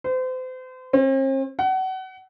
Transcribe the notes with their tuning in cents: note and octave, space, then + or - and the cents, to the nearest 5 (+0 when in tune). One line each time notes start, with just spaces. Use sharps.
C5 -35
C4 +45
F#5 +30